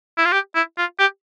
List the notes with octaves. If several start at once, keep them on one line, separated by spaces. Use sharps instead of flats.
E4
F4
G4
E4
F4
G4